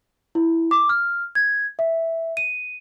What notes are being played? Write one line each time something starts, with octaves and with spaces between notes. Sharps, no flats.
E4
D6
F6
G#6
E5
D#7